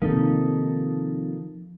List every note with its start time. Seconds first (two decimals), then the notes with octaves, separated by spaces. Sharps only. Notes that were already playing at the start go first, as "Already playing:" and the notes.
0.02 C3 D#3 F3 A#3 D#4 A4